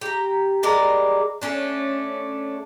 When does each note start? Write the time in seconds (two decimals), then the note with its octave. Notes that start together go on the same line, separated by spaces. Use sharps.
0.01 G4 A#5
0.63 G3 G#3 A#4 D5
1.42 A3 C#4 D4